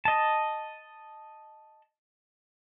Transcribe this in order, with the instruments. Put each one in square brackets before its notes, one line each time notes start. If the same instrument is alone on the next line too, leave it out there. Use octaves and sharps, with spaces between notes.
[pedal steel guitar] D#5 A5